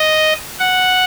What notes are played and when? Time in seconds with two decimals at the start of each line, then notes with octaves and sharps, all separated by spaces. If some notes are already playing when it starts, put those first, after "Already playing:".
Already playing: D#5
0.60 F#5